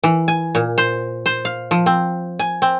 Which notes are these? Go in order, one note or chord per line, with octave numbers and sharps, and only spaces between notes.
E3
G#5
A#2
C5
C5
F5
F3
C4
G#5
C4